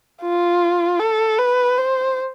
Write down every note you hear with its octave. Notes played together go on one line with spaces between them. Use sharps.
F4
A4
B4
C5